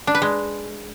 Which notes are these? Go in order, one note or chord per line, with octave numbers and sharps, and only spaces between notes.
D4
B4
G#3